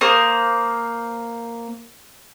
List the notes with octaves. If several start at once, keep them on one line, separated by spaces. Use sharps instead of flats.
A#3 C5 D#6